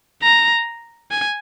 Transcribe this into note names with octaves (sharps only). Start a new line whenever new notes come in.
A#5
G#5